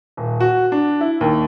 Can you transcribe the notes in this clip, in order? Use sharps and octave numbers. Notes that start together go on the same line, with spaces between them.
D#1
F#4
D4
E4
D#2